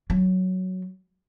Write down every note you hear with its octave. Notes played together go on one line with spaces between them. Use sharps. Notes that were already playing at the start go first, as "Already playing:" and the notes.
F#3